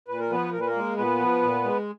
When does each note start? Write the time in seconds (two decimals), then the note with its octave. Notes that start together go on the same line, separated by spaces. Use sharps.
0.08 A#2 B4
0.20 A#4
0.30 F3 B3 B4
0.52 A#2 A#4
0.60 B4
0.67 A#3 A#4
0.76 G#3
0.97 A#2 B3 B4
1.19 F3
1.42 A#2
1.64 G#3